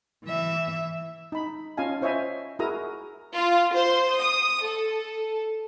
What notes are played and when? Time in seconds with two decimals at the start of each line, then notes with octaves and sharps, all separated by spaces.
0.25 E3 E5
1.32 D#4 B5
1.77 C#4 F4 D#5 F5 G#5 A5
2.01 E4 C5 C#5 D#5 E5 G#5
2.59 E4 F#4 G#4 A#4 A#5 D#6
3.34 F4
3.75 C5
4.17 D#6
4.63 A4